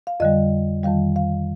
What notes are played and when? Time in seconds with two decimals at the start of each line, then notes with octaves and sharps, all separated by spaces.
0.07 F5
0.20 F2 D3 G3 D#5
0.83 F2 D#3 G3 F5
1.16 F5